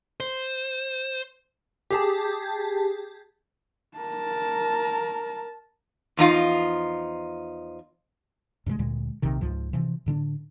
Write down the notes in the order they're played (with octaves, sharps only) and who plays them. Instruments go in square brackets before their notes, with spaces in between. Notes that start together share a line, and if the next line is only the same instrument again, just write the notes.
[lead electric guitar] C5
[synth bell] G4 G#4 A5
[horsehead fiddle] A#4 A5
[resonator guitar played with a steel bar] E2 F3 D#4 F4
[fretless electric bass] G2 C3 E3 G#3
D2 A#2 G#3
A#1 C3 D#3
C#2 G#2 F3
C3 E3 F3
A2 D3 B3 D4